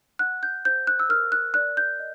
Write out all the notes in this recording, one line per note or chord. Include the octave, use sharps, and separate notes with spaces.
F#5 F#6
G6
C5 G6
F#6
E6
A#4 F6
F#6
D5 F#6
G6
D#5